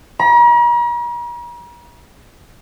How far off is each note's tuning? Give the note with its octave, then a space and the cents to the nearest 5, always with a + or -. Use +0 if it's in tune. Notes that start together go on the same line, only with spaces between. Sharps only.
A#5 +45